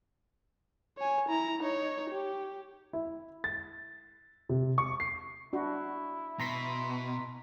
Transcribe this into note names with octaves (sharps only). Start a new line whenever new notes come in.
C#5 G#5
E4 A#5
D#4 C#5
G4
E4
A6
C3
C#6
C7
D4 E4 F#4
B2 A#5 C6 B6